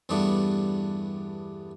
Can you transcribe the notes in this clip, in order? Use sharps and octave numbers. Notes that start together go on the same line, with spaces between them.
E2 G2 G3 A3 B3 D4